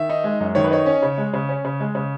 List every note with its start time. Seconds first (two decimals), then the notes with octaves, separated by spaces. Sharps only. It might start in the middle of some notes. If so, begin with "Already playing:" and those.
Already playing: D#3 E5
0.09 D#4
0.24 G#3
0.40 F#2
0.55 D#3 C#5
0.64 B4
0.71 D#4 C#5
0.86 C#4
1.02 C#3
1.18 G#3
1.33 C#3
1.49 C#4
1.65 C#3
1.80 G#3
1.95 C#3